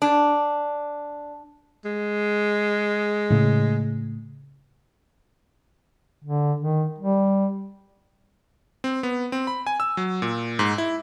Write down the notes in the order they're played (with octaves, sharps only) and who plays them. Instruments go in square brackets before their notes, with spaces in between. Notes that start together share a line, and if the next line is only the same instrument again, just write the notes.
[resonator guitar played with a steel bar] D4
[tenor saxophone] G#3
[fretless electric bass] A2 C#3 A3
[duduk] D3
D#3
G3
[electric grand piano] C4
B3
C4
B5
G#5
E6
F#3
A#2
G#2
E4